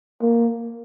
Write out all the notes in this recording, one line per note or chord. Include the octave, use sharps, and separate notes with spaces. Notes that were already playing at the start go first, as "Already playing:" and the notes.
A#3